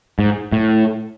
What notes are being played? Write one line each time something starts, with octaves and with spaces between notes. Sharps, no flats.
G#2
A2